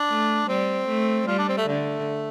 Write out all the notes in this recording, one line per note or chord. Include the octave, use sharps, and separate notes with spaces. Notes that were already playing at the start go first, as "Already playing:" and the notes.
Already playing: D4
A3
G3 C4
A3
G3 F4
D4
C4
A3
D3 A3